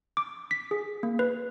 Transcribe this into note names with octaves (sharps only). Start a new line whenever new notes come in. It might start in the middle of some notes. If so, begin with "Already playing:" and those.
D6
B6
G#4
A#3
B4